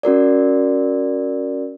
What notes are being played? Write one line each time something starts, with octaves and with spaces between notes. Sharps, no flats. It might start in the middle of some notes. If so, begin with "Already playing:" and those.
C#4 F#4 A#4 D5